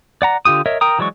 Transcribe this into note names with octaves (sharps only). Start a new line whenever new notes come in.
D5 F#5 A#5
D3 F4 G4 D#6
A#4 C#5 D#5 E5
A#4 G5 A#5 D#6
E3 F#3 G#3 D5 C#6